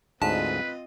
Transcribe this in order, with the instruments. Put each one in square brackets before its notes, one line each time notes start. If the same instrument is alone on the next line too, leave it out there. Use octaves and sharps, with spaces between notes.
[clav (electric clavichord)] D2 G#2 [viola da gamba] C4 F4 D#5 [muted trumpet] B4 [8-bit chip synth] A5